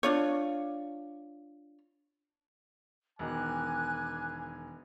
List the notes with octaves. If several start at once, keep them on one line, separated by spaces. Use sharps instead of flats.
D4 F4 C#5
E1 D#3 G#5 D6 F#6